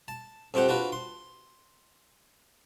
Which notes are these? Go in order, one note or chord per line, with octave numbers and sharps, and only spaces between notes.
A5
F2 F3 C4 G4 F#5
D4 F4 F#4 B4
C6